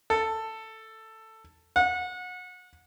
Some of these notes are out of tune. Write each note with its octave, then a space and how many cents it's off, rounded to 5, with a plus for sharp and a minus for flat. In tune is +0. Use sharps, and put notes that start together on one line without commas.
A4 +10
F#5 -25